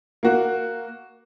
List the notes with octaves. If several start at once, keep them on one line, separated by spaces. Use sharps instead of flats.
A#3 F#4